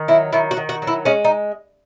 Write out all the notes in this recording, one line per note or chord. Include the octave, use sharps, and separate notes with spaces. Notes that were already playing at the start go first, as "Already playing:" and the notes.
Already playing: D#3
F#3 E4
D#3 E4
F#4
D#3
F#4
F#3
E4
G#3 C#4
D#4